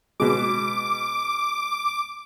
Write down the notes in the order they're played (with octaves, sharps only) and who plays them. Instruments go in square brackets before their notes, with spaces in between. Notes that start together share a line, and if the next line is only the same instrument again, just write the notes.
[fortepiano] B2 G#3 [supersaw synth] D6